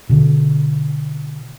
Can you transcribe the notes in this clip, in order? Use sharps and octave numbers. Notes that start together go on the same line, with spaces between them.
B2 D3